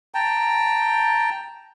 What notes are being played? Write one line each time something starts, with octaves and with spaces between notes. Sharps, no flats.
G5 A5 A#5